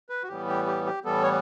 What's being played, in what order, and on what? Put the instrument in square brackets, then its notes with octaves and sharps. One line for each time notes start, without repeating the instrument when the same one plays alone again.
[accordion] B4
F#4
A2 E3 G3 B3 G4
G4
G4
G4
A2 E3 G3 B3 A4
C#5